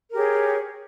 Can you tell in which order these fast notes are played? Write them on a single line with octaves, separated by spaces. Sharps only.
A#4 G4 G#4 C#5